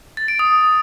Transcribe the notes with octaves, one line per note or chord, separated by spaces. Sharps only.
A6
D7
D#6